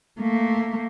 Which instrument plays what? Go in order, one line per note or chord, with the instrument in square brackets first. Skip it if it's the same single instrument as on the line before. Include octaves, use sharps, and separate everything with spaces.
[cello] A3 A#3